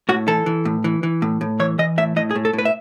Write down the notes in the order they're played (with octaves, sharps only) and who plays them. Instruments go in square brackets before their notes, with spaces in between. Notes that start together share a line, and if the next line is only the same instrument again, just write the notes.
[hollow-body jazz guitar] A2 F#4
E3 A4
E3
A2
E3
E3
A2
A2
E3 C#5
E3 D#5
A2 E5
A2 D#5
G#4
A2
A4
A2
B4
E5